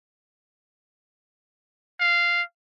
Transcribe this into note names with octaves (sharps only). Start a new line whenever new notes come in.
F5